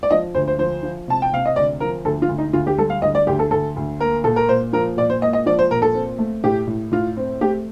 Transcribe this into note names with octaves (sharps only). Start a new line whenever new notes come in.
D5
F3 D#5
D2 C5
C5
F3 C5
F3
C3 A5
G5
C3 F5
D#5
D2 D5
F3 A#4
D2 A4
F4
D2
D#4
D2 F4
G4
G3 A4
F5
D2 D#5
D5
D2 G4
A4
D2 A4
D2
A#3 A#4
A#2 A4
A#4
A#2 C5
F3 A#4
A#2 D5
C5
A#3 D#5
D#5
F3 D5
C5
A#2 A#4
A4
C4
A3
A2 G4
A2
A2 F4
C4
A3 G4